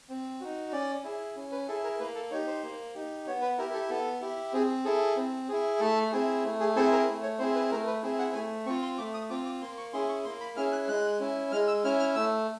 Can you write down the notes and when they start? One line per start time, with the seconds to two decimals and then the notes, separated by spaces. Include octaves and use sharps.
0.09 C4
0.40 D#4 F#4
0.72 C#4 D5
1.04 E4 G#4
1.35 C#4
1.52 B4
1.68 E4 G#4 A4
1.84 A#4
1.99 A#3 B4
2.15 A4
2.31 D#4 C#5
2.34 G4
2.47 C5
2.63 A#3
2.95 D#4 G4
3.27 B3 C#5
3.42 B4
3.58 E4 G4 A#4
3.73 A4
3.90 B3 A4
4.21 E4 G4
4.53 C4 G#4
4.85 E4 G#4 A4
5.16 C4
5.49 E4 G#4
5.80 A3 A4
6.12 C4 E4 G#4
6.44 A3
6.60 G#4
6.75 C4 E4 G#4 A4
6.92 A#4
7.07 A3
7.23 C#5
7.39 C4 E4 G#4 C5
7.55 B4
7.71 A3 A#4
7.87 B4
8.03 C4 E4 G#4
8.19 F#5
8.34 A3 G#5
8.66 C4 C#6
8.70 F4
8.82 C6
8.98 A3 D6
9.14 D#6
9.30 C4 F4 D6
9.45 D6
9.61 A#3 C6
9.78 C#6
9.93 C#4 E4 G#4 C6
10.09 C#6
10.25 A#3 C6
10.41 B5
10.57 C#4 E4 G#4 F6
10.72 F#6
10.88 G#3 F#6
11.20 C#4 E4
11.52 G#3 F6
11.68 E6
11.84 C#4 E4 F6
11.99 F6
12.15 A3 E6